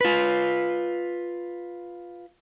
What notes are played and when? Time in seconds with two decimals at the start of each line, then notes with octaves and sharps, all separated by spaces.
0.01 F4 B4